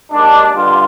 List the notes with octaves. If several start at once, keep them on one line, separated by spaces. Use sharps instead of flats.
D#2 D#3 G#3 D4
G2 D3 G3 F4